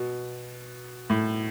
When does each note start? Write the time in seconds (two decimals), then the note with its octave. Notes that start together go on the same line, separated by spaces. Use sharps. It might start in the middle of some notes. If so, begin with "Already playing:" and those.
Already playing: B2
1.10 A2